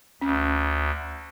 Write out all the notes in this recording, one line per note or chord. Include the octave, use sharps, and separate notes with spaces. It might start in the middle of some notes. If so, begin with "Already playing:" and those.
D2 C#4